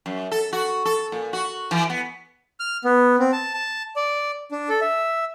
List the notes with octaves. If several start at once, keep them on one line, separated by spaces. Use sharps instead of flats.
F#2
A4
F#4
A4
A#2
F#4
E3
B3
F6
B3
C4
A5
A5
D5
D4
A4
E5